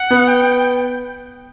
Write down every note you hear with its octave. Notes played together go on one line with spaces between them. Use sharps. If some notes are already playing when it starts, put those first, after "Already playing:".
Already playing: F#5
B3
G5